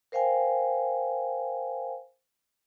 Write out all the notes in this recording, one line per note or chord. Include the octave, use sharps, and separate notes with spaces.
A#4 C5 F5 G5 G#5